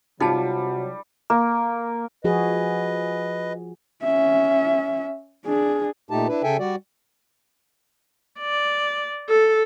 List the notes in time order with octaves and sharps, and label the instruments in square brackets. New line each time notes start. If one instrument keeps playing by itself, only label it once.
[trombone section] C3 F#3 [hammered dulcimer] G3 [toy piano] D#4 G#4 A5 [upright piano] F4
[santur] A#3
[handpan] F3 F#4 G#4 [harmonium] B4 D#5
[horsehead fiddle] C#4 E5
D4 G#4
[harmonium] A#2 A3 D#4 G4 A5
D4 E4 B4
C#3 A4 E5 G5 G#5
G3 F#4 D5
[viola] D5
A4